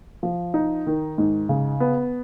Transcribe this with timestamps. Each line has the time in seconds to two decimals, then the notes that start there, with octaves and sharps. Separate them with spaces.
0.23 F3
0.54 D#4
0.87 D#3
1.18 G#2
1.49 C#3
1.80 B3